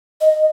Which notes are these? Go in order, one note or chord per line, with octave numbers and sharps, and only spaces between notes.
D#5